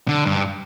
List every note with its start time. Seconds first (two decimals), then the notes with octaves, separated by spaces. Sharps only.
0.08 D3
0.26 G2